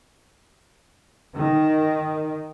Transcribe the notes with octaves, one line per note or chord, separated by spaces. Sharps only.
D#3